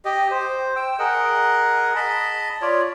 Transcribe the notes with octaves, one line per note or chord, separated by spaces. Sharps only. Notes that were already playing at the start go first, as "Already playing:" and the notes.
G4 D#5
C5
G5 E6
G#4 A#4 D#5 F#5
D#5 A5 B5
F4 C#5 D5